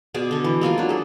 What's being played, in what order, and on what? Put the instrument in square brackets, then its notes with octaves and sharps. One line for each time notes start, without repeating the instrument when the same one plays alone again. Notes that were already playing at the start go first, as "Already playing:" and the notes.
[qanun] B2 G#4 D5 G#5
D3 A4
E3
G#3 A#3 F4 G#5
F#3 D4
G#4 A4